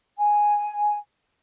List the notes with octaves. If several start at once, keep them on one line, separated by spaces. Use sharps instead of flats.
G#5